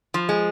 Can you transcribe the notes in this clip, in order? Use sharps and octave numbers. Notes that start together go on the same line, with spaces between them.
F3
G#3